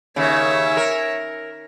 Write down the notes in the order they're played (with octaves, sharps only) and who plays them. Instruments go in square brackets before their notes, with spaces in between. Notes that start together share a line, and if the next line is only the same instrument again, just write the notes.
[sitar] D#2 C#3 [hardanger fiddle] C#5 E5
[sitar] A#4